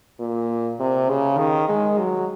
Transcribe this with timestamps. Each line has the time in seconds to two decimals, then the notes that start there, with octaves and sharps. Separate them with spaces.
0.20 A#2
0.80 C3
1.09 C#3
1.39 D#3
1.69 G#3
1.99 F#3